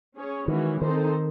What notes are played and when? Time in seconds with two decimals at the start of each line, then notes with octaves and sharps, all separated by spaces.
0.16 C#4 G#4 C#5
0.48 D#3 E3 G#3 C#4 F#4
0.81 D#3 C4 D#4 A4 C5